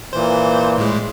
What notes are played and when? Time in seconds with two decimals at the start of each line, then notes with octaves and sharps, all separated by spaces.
0.13 A#2 E3 C5
0.78 A2 G#3